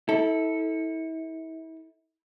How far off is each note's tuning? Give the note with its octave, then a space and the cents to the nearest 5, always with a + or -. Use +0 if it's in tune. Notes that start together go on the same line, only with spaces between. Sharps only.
E4 -35 A4 +0